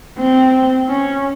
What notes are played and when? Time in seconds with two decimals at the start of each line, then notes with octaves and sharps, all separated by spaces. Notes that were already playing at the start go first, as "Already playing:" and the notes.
0.19 C4
0.89 C#4